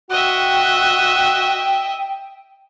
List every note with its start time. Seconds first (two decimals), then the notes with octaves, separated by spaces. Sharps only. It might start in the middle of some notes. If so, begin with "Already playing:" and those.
0.10 F#4 D#5 E5 G5